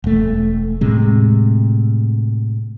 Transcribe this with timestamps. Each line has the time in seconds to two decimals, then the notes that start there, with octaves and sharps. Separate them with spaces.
0.04 E1 A3
0.81 A2 C3 G#3